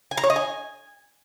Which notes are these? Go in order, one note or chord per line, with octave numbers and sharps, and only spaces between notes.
G#5
A#5
C#5
D#5
G#5